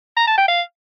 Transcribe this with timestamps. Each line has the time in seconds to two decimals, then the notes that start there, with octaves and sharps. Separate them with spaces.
0.17 A#5
0.27 A5
0.38 G5
0.48 F5